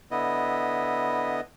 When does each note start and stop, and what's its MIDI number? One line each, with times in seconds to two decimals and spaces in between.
0.11 1.41 50
0.11 1.41 59
0.11 1.41 64
0.11 1.41 75